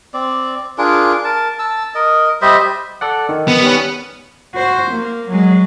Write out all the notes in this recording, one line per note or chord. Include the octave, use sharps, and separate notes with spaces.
C4 D5
D4 F4 G#4 A#4
A#4 A5
A5 E6
A#4 D#5
G3 C5 D#5 E5
A4 D5 F#5
D#3
B3
G3 C#4
F#4 C5
A#3
F#3 G#3